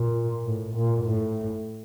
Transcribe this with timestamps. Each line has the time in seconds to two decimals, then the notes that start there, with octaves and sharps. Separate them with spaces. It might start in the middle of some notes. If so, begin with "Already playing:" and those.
Already playing: A#2
0.45 A2
0.76 A#2
1.04 A2